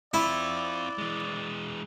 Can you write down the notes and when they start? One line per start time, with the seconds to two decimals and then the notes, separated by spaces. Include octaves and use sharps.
0.14 C4 E4 F4 D5
0.98 E3 G#3